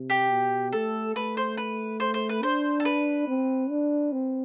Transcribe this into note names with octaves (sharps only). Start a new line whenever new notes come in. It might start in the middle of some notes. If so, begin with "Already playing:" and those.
Already playing: C3
G4
B2
A3 A4
A3 B4
C5
B4
C5
C5
B4
D4 C5
A4
B4
C4
D4
C4